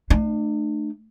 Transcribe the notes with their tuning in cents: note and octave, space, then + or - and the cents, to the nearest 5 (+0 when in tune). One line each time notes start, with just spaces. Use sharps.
A3 +0 D4 +40